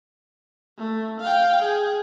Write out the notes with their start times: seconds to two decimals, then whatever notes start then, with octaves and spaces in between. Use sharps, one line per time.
0.78 A3
1.20 F5 G5
1.62 G#4